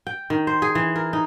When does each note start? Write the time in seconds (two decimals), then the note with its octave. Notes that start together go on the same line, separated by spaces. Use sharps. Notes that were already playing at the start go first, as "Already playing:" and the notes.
0.07 G5
0.30 D#3
0.47 C5
0.62 G#4
0.75 E3
0.96 A#4
1.13 D#4